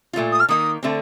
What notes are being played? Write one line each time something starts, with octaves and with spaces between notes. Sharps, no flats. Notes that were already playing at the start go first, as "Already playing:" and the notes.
A#2 A3 C4 F4
D#6
F6
D#3 A#3 D#4 D#6
D3 A3 C4